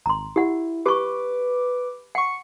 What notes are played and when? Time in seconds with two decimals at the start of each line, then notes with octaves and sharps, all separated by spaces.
0.06 G#1 A#5 C6
0.36 E4 G4 F#5
0.86 G4 B4 C#6 D6
2.15 F#5 C#6 C#7